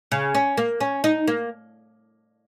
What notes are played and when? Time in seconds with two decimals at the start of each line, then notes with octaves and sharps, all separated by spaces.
0.12 C#3
0.35 C#4
0.57 A#3
0.80 C#4
1.04 D#4
1.28 A#3